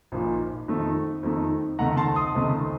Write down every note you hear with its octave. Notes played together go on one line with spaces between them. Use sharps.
A#1 A#2 F3 A#3 D#4
F2 D#3 A3 D#4
F2 D#3 A3 D#4
C#2 C3 D#3 A3 F#5 A#5
A5 C6
C6 D#6
C#2 C3 D#3 A3